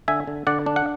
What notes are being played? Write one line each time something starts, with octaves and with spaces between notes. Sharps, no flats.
D3 E5 G#5
D3
D3 D5 F#5
D4
F#5